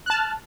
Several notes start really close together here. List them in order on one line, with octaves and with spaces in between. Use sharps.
F#6 A5 F6